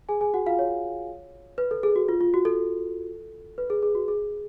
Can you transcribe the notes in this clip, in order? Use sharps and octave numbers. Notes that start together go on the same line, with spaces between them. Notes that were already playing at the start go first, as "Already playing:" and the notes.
G#4 G#5
G#4 G#5
F#4 F#5
F4 F5
C#5
B4
A4
G#4
F#4
F4
F4
F#4
A4
B4
G#4
G#4
F#4
G#4